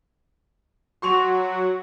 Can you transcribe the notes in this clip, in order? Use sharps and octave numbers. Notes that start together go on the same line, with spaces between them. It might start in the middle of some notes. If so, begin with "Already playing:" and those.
F#3 F#4 C6 C#6 F7